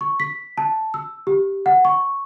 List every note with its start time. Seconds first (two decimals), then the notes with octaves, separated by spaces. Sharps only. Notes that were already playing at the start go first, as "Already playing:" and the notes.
0.01 C#6
0.20 B6
0.58 A5
0.94 E6
1.27 G4
1.66 F#5
1.85 C#6